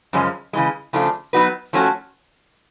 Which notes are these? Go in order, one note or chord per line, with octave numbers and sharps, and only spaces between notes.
F#2 C#3 F3 G#3 C#4
C#3 E3 G#3
C#3 F3 A3 D4 F4
F#3 B3 D#4 F#4 B4
F3 A3 C#4 F#4 A4